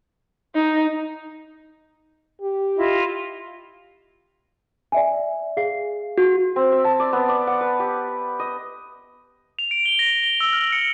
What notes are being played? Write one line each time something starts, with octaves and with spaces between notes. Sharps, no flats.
D#4
G4
E4 F4 D#5
D5 E5 G#5
G#4 F5 C7
F#4
C4
E5
A5
D5
B3
D5
F#5
B4
G4
D#5
F7
D7
G7
A#6
G7
E6
F6
C#7